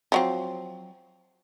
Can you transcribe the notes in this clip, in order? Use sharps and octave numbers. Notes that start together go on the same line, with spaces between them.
F3 F#3 C4